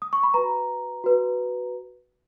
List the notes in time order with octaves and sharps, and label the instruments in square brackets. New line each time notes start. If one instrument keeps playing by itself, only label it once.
[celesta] D#6
C#6
B5
F#4 B4 A#5
F#4 B4